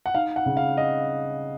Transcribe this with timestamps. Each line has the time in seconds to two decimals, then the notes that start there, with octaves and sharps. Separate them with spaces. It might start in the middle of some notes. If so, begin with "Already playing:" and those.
0.06 F#5
0.14 D#4 F5
0.36 F#5
0.46 C#3
0.57 F5
0.77 D#5